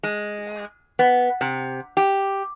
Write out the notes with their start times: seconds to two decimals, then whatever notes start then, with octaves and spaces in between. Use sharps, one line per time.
0.03 G#3
0.99 B3
1.41 C3
1.97 G4